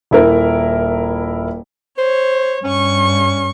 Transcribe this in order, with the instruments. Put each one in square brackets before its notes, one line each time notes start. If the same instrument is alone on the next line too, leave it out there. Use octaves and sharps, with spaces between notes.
[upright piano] D#1 E4 A#4
[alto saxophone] C5 [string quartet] C#5
[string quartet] G2 C#6 [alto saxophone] C#4